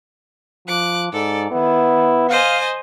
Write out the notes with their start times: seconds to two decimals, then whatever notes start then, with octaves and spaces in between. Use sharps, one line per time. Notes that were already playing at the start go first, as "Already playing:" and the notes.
0.68 F3 D6 F#6
1.13 G#2 A4 D5
1.51 D#3 B3 E4
2.29 C5 D#5 F5 G#5